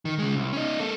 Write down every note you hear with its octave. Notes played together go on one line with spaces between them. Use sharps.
D#3
C#3 G#3
C2
C#4 D#4
A#3 A4